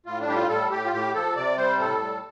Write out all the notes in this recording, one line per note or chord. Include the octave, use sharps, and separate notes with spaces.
A2 F4
D4
G3 G4
F4
A2 A4
A2 G4
F4
A2 G4
F3 A4
C3 D5
G3 C5
A2 A4
G3